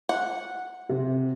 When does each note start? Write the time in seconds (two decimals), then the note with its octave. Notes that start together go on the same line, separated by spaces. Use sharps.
0.09 F#5
0.89 C3